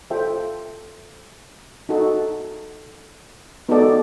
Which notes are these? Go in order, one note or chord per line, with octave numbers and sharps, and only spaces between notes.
F4 A4 C5 E5 G5
D#4 F#4 A4
B3 D#4 F#4 A4 D5